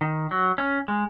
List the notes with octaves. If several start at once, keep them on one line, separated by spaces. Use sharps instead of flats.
D#3
F#3
C#4
G#3